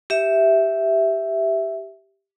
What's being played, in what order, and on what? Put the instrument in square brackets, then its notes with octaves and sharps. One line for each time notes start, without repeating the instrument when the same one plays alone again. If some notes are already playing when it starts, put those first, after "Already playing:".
[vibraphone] G4 E5